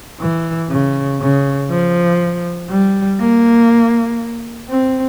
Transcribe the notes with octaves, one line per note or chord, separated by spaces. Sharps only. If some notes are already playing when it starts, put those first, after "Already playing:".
E3
C#3
C#3
F3
G3
A#3
C4